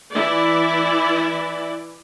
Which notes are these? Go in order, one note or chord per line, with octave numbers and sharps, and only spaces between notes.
E3 E4 D5